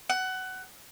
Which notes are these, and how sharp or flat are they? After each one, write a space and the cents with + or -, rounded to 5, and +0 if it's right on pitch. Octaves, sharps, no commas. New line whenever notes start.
F#5 +20